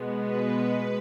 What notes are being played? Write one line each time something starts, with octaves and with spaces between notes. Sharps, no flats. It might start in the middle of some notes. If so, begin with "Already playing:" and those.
Already playing: B2 G#3 B3
B4